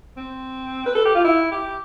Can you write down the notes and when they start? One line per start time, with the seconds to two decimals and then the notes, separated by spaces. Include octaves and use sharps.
0.17 C4
0.86 B4
0.95 A4
1.05 G4
1.14 F4
1.24 E4
1.51 G4